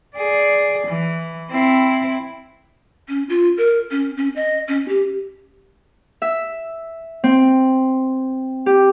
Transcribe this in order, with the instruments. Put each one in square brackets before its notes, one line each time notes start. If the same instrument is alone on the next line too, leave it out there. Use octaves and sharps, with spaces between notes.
[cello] G#4 D5
E3
C4 E4
[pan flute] C#4
F4
A#4
C#4
C#4
D#5
C#4
G4
[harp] E5
C4
G4